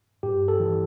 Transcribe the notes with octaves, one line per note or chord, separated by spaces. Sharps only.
G2 G4
A4
E3